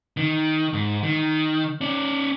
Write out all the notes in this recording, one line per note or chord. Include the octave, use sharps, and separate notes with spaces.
D#3
G#2
D#3
C#4 D5